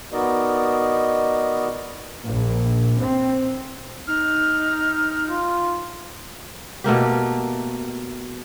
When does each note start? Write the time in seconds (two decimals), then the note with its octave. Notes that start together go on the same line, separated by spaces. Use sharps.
0.12 B3 D#4 F#4 A#4 D5 D#5
2.24 A#1
2.99 C4
4.07 D#4 F6
5.28 F4
6.84 B2 A3 A#3 G4